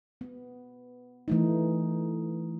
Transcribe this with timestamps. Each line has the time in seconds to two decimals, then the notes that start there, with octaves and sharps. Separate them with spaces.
0.21 B3
1.28 E3 A3 D#4